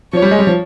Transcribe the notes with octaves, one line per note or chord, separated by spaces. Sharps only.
F3 C#5
G3
G#3
G3
F3